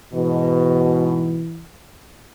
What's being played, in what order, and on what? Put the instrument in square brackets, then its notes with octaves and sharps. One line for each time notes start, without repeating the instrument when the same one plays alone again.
[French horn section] G#2 B2 [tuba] E3